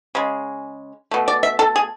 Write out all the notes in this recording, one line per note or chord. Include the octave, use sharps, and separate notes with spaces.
C#3 G#3
B2 A3
D5
E5
A4
G#4